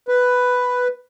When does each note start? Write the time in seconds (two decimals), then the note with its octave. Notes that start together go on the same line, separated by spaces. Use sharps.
0.08 B4